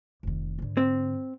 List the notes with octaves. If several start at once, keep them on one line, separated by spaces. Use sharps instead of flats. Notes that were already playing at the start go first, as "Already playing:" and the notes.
F1 D#3
G#2 D3
C4